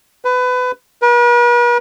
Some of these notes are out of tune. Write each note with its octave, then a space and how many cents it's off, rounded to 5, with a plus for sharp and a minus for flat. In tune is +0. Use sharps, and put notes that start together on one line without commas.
B4 +25
B4 -45